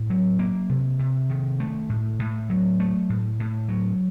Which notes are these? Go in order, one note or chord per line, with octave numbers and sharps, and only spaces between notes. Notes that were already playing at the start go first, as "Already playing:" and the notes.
Already playing: A2
F#3
A#3
C3
C3
D#3
A3
A2
A2
F#3
A3
A2
A2
F#3